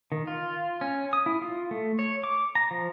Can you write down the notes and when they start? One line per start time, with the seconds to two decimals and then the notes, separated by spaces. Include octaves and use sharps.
0.12 D#3
0.27 F4
0.81 C#4
1.13 D#6
1.26 E4
1.42 F4
1.71 A3
1.99 C#5
2.24 D6
2.55 A#5
2.71 F3